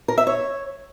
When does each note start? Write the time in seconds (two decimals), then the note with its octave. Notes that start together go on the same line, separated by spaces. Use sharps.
0.08 A#4
0.18 E5
0.27 C#5